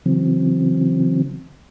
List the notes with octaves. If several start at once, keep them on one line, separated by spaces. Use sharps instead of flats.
C#3 E3 F#3 C4